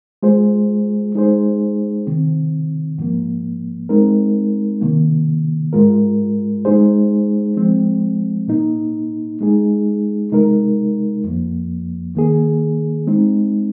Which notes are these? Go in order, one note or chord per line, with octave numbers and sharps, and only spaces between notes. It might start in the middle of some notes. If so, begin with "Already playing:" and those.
G#3 F4 G#4 C5
G#3 D#4 G#4 C5
C3 D#3 C4
G#2 F3 A#3
G#3 C4 D#4 A#4
C3 D#3 A#3
G#2 G#3 F4 A#4
G#3 D#4 G#4 C5
F3 G#3 C4
A#2 A#3 D#4
G#3 D#4 G#4
C3 G#3 D#4 A#4
F2 F3 A#3
D#3 A#3 G#4
G#3 C4 D#4